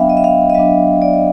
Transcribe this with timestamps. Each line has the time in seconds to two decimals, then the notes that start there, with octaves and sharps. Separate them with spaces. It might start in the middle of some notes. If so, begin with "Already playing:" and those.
Already playing: F#3 B3 D4 E5 F5 G5
0.09 D#5
0.17 E5
0.24 F5
0.50 D#5
0.55 F#3 B3 D4 E5
1.02 D5
1.14 D#5